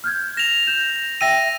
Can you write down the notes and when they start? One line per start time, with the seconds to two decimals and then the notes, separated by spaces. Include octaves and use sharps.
0.04 F6 G6 G#6
0.37 A#6 E7 F7
0.67 G6 E7
1.21 E5 G5 E6 A#6 D#7